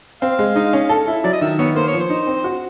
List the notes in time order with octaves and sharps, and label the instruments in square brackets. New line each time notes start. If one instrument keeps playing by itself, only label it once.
[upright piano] C4 [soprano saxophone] F5
[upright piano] G#3
D#4
C#4
A4
E4
[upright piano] F#3 [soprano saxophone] D5
[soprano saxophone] D#5
[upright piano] D#3 [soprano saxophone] E5
[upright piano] B3 [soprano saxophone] C#5
[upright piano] A#3 [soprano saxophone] C5
[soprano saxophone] C#5
[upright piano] F3
[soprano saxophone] C5
[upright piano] D#4
C4
F#4